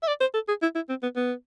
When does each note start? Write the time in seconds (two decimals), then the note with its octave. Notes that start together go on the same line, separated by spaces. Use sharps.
0.03 E5
0.07 D5
0.21 C5
0.34 A4
0.48 G#4
0.62 E4
0.75 E4
0.89 C4
1.02 B3
1.16 B3